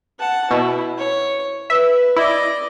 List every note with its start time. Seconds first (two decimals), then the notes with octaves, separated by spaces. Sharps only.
0.19 F#5 A5
0.51 B2 E4
0.98 C#5
1.70 B4 E5
2.16 E4 D5 D#5